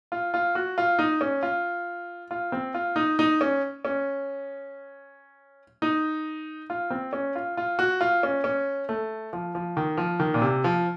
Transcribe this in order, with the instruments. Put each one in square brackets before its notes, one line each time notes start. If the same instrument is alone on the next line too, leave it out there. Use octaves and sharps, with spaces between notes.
[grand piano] F4
F4
F#4
F4
D#4
C#4
F4
F4
C4
F4
D#4
D#4
C#4
C#4
D#4
F4
C4
C#4
F4
F4
F#4
F4
C#4
C#4
A3
F3
F3
D#3
F3
D#3
A#2
C3
F3